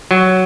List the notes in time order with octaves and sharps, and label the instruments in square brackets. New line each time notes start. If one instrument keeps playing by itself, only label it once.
[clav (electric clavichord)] F#3